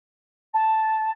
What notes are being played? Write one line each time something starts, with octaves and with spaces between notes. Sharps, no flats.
A5